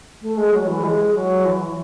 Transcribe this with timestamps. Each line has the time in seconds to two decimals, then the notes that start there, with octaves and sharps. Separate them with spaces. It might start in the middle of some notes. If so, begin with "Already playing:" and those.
0.22 A3
0.37 G#3
0.53 F#3
0.63 F#3
0.67 E3
0.83 G#3
1.14 F#3
1.45 E3